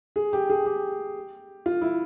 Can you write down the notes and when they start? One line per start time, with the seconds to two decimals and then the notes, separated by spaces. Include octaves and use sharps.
0.16 G#4
0.33 G4
0.50 G#4
0.65 G4
1.66 F4
1.82 E4